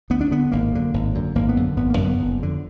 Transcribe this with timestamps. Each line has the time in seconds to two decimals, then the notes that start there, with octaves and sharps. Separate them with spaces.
0.10 D2 B3
0.21 D4
0.31 D3 B3
0.52 G#1 A#3
0.73 F#2 D3
0.94 G#1
1.15 F#2 D3
1.35 G#1 A#3
1.49 B3
1.57 F#2 D3
1.77 G#1 B3
1.90 A#3
1.97 F#2 D3
2.05 B3
2.19 F#1
2.39 F2 D3